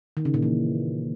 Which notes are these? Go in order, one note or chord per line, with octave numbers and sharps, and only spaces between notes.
D#3
C#3
A#2
E3